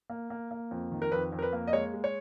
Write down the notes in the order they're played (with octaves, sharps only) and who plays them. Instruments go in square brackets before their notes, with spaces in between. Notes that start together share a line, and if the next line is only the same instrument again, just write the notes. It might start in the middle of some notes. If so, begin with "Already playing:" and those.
[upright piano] A#3
A#3
A#3
F2
D#3
A#4
F2 B4
F2
A#4
B4
A#3
D#5
G#3 C#5
G#3
C#5